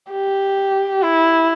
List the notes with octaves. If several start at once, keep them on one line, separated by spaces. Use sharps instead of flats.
G4
E4